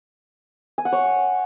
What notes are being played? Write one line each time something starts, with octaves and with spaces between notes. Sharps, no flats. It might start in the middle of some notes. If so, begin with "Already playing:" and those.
G#5
F#5
C#5